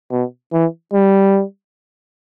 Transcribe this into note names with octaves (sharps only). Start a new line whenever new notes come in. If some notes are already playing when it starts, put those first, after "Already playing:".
B2
E3
G3